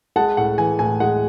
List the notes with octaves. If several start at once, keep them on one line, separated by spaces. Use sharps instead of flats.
G#3 F#5 A5
A2 F#5
E3 G#5
A2 G#5
G#3 F#5